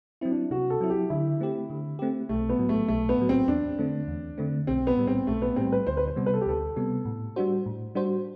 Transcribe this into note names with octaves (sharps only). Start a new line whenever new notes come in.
F#3 C4 E4
D4
C3 F#4
A4
F#3 C4 E4
G4
D3 E4
A3 C4 G4
D3
A3 C4 G4
B1 A3
B3
A2 F#3
A3
B1 A3
B3
A2 F#3
C4
E2 D4
D3 A3 C4
E2
D3 A3 C4
B1 C4
B3
A2 G3
C4
B1 A3
B3
A2 G3 C4
B4
D2 C5
B4
C5
C3 G3 B3
B4
A4
G4
D2 A4
C3 G3 B3
A2
G3 D4 F#4 C5
A2
G3 D4 F#4 C5